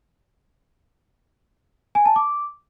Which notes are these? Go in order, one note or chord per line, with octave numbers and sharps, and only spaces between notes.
G#5
A5
D6